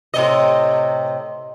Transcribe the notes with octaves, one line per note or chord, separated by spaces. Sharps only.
A2 C3 D#5